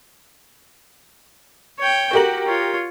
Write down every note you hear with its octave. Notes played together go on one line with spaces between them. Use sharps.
C#5 G5
F#4 G4 A#4 F#7
F4 C#5